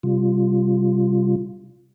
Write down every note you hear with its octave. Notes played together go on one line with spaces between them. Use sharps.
C3 G3 F4